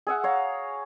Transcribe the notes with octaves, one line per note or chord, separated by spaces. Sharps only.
G#4 E5 F#5
C#5 F5 A#5